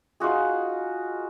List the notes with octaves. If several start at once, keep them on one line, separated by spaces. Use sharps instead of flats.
D#4 F4 F#4 G#4